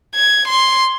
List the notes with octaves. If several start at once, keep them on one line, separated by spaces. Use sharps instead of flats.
G#6
C6